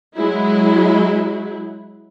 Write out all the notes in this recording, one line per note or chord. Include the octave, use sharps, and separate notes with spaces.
F#3 G#3 E4